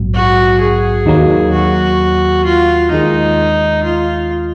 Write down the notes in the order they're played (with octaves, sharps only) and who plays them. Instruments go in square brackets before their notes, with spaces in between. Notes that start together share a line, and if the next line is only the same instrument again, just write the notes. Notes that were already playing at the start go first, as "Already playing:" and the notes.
Already playing: [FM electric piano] A#1 G#2 F#3 B3
[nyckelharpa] F#4
G#4
[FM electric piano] D#2 D#3 F#3 A#3
[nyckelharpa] F#4
F4
[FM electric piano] D#2 D#3 G#3 [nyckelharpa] D#4
[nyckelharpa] F4